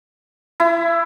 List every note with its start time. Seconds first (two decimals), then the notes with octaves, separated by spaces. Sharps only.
0.60 E4